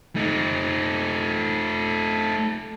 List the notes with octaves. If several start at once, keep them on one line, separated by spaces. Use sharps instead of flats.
A3 D#4